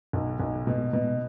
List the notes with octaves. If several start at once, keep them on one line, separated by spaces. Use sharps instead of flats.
B1
B1
B2
B2